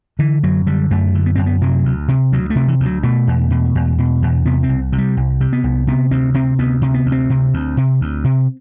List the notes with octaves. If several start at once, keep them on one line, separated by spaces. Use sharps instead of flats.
D3 E3
F#2 F#3
D3 G3
F#2 A3
D3
B3
F#2 C4
B3
C3 F#3
D2
C3
D2 F#3
A3
C3
E3
D2
F#3
B2 A3
E2
B2
E2
B2
E2
C3 B3
C4
C2
C3
G3
C2
C3
B3
C2
C3 B3
D2 C4
C3 C4
D2 B3
C3
B3
D2
C4
C3
D2
C3
D2
C3